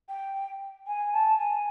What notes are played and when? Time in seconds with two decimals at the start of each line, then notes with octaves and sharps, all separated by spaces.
0.09 G5
0.87 G#5
1.13 A5
1.39 G#5